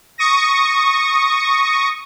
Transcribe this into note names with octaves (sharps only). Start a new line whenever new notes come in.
C#6 D#6 A#6